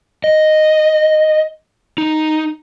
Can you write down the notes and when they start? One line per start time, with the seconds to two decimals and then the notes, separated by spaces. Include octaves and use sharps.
0.24 D#5
1.98 D#4